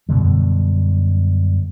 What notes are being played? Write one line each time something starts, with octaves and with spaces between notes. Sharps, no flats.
F#2 B2 D3 G3